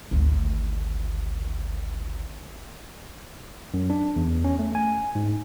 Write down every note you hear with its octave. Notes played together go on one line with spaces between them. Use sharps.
G#1 D2
F#2
D4
E2
C#4
A3
G#5
G#2